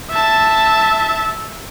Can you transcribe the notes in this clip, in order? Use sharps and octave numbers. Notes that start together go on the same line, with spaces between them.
E5 A5